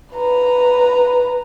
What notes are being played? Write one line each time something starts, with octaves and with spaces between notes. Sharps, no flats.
B4 A#5